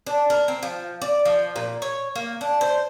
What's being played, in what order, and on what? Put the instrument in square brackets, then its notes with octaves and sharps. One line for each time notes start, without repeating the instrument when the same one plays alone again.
[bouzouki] D4
A#4
C4
F3
D5
F3
A#2
C#5
A#3
D4
C5